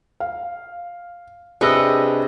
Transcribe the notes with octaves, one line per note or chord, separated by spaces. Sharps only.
F5
C3 D4 G#4 B4 D#5 C#6 D6 E6